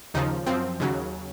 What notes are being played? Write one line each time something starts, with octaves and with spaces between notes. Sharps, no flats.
D#2 C#3 F3 D#4
F#2 F3 C4
D#2 C#3 F#3